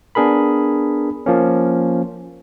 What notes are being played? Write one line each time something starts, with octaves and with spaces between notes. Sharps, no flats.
B3 D4 G#4 A#4 B5
F3 A#3 C#4